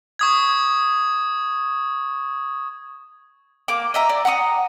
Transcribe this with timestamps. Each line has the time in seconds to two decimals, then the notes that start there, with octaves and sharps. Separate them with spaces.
0.19 C#6 D#6 G#6
3.68 A#3 D6
3.94 D#5 E5 A#5
4.09 D5
4.25 F#5 A#5 C#6 D#6